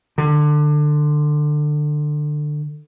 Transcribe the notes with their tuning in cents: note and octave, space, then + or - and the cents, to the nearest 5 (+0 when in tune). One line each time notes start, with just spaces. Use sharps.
D3 +20